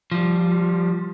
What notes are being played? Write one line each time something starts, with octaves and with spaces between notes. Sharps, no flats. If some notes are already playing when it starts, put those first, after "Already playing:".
F3 G3